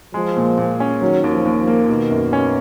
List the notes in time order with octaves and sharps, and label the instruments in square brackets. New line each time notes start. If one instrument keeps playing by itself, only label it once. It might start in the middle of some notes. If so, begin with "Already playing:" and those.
[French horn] F3 [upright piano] G#3
[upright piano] A#2
A#2
C#4
[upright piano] D#3 [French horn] F#3
[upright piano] D#2
[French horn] F3
[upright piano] D#2
[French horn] F3
[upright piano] A#3
[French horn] B2 [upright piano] D#3
[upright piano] F#2
C#4